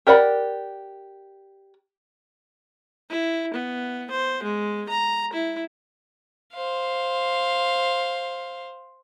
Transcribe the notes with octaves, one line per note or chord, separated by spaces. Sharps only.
G4 A#4 D5 F#5 B5
E4
B3
C5
G#3
A#5
E4
C5 F5